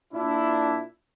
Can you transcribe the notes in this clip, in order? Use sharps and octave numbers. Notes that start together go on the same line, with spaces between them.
A#2 D4 E4